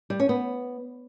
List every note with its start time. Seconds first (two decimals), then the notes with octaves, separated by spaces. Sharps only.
0.10 G3
0.20 C#4
0.29 B3